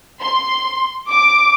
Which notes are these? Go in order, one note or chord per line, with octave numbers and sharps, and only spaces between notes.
C6
D6